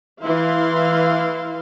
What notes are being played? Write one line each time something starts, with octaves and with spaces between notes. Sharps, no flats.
E3 E4 F5 C6